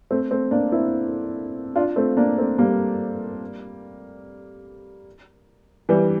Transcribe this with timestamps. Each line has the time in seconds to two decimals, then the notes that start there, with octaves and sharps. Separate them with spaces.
0.11 A3 C4
0.31 A3 C4
0.51 A#3 D4
0.72 C4 E4
1.76 D4 F4
1.96 A3 C4
2.17 A#3 D4
2.38 A3 C4
2.58 G3 A#3
5.89 E3 G3